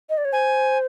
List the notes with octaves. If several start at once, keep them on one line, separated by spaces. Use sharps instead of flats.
D#5
D5
C#5
C5 G#5